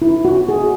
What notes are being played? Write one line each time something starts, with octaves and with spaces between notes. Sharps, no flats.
E4
F#4
G#4